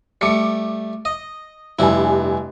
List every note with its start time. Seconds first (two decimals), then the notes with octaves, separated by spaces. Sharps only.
0.21 G3 A3 D6 C#7
1.05 D#5
1.79 F1 G2 G3 E4 G#5